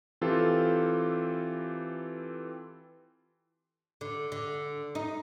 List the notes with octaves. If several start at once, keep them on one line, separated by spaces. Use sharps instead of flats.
E3 C4 F4 G4 A4
D3
D3
D#4